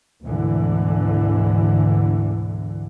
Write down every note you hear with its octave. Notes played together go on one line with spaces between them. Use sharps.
D2 G#2 B2 D3 E3